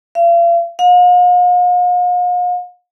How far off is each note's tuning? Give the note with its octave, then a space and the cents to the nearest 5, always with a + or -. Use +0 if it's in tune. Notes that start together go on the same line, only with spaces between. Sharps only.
F5 -40
F5 +45